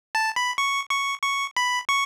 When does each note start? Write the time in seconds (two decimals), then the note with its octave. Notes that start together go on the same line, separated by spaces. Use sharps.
0.15 A5
0.36 B5
0.58 C#6
0.91 C#6
1.23 C#6
1.57 B5
1.89 C#6